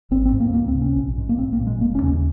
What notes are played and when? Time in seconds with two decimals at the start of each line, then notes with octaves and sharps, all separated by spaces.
0.11 G#1 C4
0.25 C4
0.32 G#2
0.40 A#3
0.54 C#2 A#3
0.68 C4
0.75 C3
0.82 C#4
0.96 A#1
1.17 G#2
1.29 A#3
1.38 A#1 C4
1.53 A#3
1.60 A#2
1.67 G#3
1.80 F1 A#3
1.95 C#4
2.02 D#2 C#3
2.09 C#4